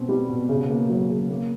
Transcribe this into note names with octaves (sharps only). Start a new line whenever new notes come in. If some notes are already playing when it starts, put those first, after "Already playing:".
Already playing: B2 C4
G3
B2
C#3
A#3
F#3
C#3
A#3